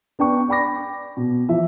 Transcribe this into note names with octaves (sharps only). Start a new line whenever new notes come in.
B3 D4 G5 C#6
D5 G5 B5 D6 A#6
B2
E3 F3 E5